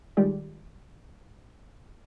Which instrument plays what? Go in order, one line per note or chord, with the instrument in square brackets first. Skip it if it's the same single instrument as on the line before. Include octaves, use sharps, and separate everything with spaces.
[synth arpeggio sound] D#3 G3 G#3 F4 G4 D5